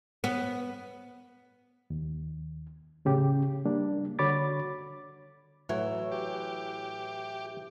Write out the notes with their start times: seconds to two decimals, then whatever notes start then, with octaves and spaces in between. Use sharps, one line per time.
0.24 B3
1.90 D#2
3.05 A2 C#3 G4
3.65 G3 A#3 D4
4.19 D3 F#4 C#5 B5 D6 A6
5.69 A2 E3 F#3 C#5
6.12 G4